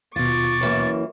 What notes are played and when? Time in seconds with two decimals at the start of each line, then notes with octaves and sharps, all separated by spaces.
0.16 D#2 B2 F4 C#6 D6 A6
0.61 F#2 E3 A#3